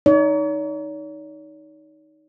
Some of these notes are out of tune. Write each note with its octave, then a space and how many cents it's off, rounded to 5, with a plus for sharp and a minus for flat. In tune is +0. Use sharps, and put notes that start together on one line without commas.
D#4 +0 C#5 +45